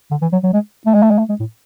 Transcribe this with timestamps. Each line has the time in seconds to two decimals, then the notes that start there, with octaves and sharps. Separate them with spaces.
0.11 D3
0.22 E3
0.32 F#3
0.44 F#3
0.54 G#3
0.87 A3
0.95 G#3
1.03 A3
1.11 G#3
1.19 A3
1.29 G#3
1.40 A2